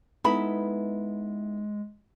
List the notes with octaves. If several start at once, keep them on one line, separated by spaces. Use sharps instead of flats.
G#3 B3 D#4 E4 A4 B5